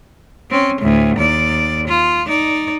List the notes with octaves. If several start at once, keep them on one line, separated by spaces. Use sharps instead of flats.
C4 C#4
D2 A2
D#2 D5
F4
D#4 D5